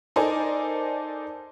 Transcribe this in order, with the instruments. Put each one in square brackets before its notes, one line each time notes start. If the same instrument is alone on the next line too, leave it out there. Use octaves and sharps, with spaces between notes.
[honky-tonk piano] D#4 A4 A#4 C5 D5 G#5